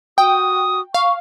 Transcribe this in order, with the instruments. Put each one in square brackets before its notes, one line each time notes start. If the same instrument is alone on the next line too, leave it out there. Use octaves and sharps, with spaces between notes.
[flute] F#4 [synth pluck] G5 [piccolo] D#6
[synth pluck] F5 [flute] C#6